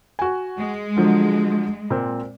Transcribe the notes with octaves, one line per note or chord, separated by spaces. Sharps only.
F#4 G#5
G#3
D3 F3 F#3
A#2 C4